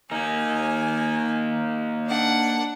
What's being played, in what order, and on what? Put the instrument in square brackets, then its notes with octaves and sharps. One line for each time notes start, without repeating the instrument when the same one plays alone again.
[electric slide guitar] A#3 D#4 [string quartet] G#5
[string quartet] D4 F#5